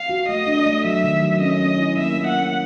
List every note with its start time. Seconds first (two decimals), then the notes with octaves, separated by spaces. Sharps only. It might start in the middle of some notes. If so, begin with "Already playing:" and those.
Already playing: F5
0.09 F#4
0.28 A3 D#5
0.47 D4
0.66 A3
0.85 F#3 E5
1.04 D#3
1.22 F#3
1.41 C#4 D#5
1.60 C#4
1.79 E4
1.98 A#3 E5
2.17 A#3
2.27 F#5
2.35 C#4